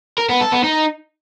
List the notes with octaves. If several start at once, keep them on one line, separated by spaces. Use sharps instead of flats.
A#4
B3
A4
B3
D#4